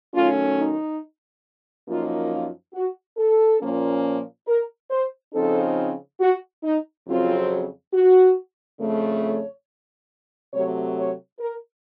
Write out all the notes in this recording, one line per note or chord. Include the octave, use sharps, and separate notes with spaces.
D#3 F#3 A3 C#4 F4
D#4
F#2 F3 A#3 D#4 F4
F4
F#4
A4
A#2 F3 A#3 C#4
A#4
C5
C#3 F3 C4 D#4 A4
F#4
D#4
F2 C#3 F#3 C4 F4
F#4
F2 C#3 A3
C#5
C3 F#3 A3 C#5
C#5
A#4